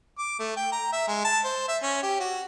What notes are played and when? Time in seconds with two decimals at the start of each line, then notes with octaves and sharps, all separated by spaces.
0.19 D6
0.40 A3
0.57 G5
0.72 A#5
0.93 E5
1.08 G#3
1.24 A5
1.44 C5
1.69 E5
1.83 C#4
2.03 G4
2.20 F#4